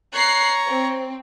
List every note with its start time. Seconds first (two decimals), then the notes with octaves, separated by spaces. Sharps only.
0.13 C#5 A#5 F#6 C7
0.67 C4